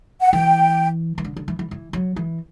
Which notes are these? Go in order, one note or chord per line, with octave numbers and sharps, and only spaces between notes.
F#5
E3 G5
E3
D3
D3
E3
E3
E3
F#3
E3